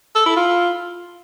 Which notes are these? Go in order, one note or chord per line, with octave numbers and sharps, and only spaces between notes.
A4
E4
F4